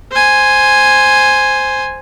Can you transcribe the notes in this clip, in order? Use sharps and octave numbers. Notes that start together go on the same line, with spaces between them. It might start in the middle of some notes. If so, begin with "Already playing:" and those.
C5 G#5